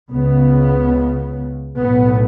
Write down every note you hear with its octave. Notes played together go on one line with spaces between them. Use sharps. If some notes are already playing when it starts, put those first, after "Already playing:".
C#2 C#3 B3
B1 A2 B3